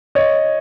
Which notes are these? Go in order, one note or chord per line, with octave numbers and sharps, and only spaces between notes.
C#5 D#5